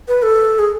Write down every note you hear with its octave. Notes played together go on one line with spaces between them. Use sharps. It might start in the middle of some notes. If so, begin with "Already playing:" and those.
B4
A4
G#4